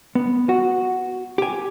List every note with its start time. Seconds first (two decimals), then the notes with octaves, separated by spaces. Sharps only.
0.15 B3
0.49 F#4
1.38 G4 G#5